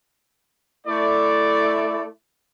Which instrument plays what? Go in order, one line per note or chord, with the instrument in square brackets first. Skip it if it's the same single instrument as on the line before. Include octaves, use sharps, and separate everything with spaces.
[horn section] A3 E4 D5